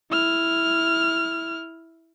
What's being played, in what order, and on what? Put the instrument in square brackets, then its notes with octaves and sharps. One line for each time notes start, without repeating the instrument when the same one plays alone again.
[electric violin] E4 F6